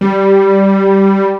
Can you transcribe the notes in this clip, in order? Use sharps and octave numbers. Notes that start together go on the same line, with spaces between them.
G3